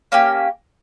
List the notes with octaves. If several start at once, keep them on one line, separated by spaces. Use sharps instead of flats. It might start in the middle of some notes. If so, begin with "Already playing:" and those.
A#3 C#4 G4